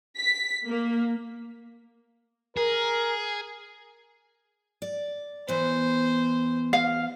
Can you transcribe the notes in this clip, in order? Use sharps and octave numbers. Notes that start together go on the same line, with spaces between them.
B6
A#3
G#4 A#4
D5
E3 B3 C5
F5